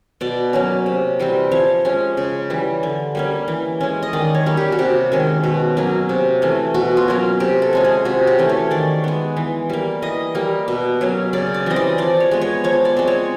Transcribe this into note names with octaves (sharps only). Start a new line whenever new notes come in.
B2 D5
F#3 A#3 C#4
C3
E3 G3 C4
F3 C#5
G#3 C#4
C#3
E3 G3
D3
G3 A#3 C#4
E3
G#3 C#4
D#5
D#3 D5
C#5
G3 A#3 C#4
G4
F#4
C3 G4
D#3 G#3 C#4
B2
F#3 A#3 C#4
C3
E3 A3 C#4
B2 F#4
F4
F#3 A#3 C#4
C3 G4
A4
F3 G#3 C#4
G#4
C3 F#4
G4
E3 A3 C#4
C#5
D#3 D5
G#3 B3
E3
G3 A#3
E3 D#5
G3 A#3
B2
F#3 A#3 C#4
C#3 D5
D5
E3 G3 C4 D#5
D5
F3 D5
C#5
G#3 B3
C#5
F3 C#5
D5
G#3 C4
C#5